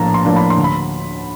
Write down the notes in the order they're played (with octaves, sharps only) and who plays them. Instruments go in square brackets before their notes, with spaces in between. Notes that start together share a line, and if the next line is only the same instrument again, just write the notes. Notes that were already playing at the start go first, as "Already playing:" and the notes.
Already playing: [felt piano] A#1 A2 F3 A#3 A5 A#5
C6
A2 F3 A#3 D4
B5
C6
D2
B5